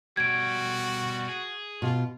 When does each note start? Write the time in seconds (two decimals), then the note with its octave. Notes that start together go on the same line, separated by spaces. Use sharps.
0.17 B2 G3 F#4 G#6 D7
1.29 G#4
1.82 B2 F4